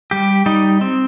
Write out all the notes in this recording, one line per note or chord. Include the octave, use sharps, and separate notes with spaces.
G3 G4
G3 D#4
C4